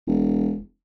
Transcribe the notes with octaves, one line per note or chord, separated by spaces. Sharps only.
E1